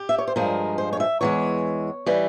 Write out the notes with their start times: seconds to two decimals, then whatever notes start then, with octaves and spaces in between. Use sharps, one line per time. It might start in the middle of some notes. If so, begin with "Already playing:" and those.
Already playing: G4
0.09 E5
0.18 C#5
0.27 C5
0.36 G2 F3 G#3 A#4
0.78 C5
0.93 C#5
1.00 E5
1.21 E2 E3 G#3 C#5
2.06 E3 G3